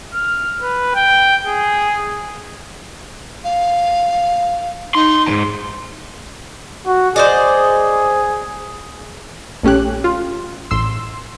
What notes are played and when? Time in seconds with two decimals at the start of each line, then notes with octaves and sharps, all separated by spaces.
0.14 F6
0.62 B4
0.95 G5
1.45 G#4
3.44 F5
4.95 D#4 C6
5.27 E2 G#2
6.87 F#4
7.16 G#4 C5 D5 D#5
9.63 A#1 A3 C#4 G4 F#6
10.04 F4
10.71 A1 C6 E6